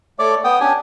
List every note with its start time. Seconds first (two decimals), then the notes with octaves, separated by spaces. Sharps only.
0.19 A3 C#5 D5 D6
0.44 B3 G5 D#6
0.60 C#4 D4 G4 G#5